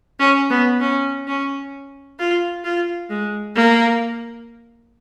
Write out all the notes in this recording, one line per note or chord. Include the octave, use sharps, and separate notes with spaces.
C#4
B3
C#4
C#4
F4
F4
G#3
A#3